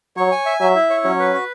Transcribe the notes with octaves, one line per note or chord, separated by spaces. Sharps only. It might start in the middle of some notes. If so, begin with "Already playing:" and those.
F#3 C#5
G#5
E5
F#3 E5
E4
C#5
F#3 C#4
B4
F#4